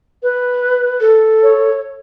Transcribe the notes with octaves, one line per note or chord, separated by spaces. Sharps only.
B4
A4
C#5